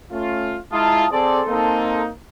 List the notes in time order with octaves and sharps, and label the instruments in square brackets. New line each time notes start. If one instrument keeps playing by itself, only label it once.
[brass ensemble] A3 C#4 F4
[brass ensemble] G#3 E4 F4 [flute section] A5 A#5 D#6
[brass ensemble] C4 G#4 D5 [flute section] A4 C6
[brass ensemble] A#3 C4 D#4